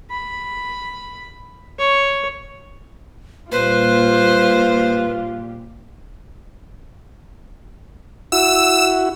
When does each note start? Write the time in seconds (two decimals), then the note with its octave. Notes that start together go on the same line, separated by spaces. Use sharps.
0.11 B5
1.79 C#5
3.52 A#2 G3 F4 G4 B4 C5
8.32 E4 F#4 E6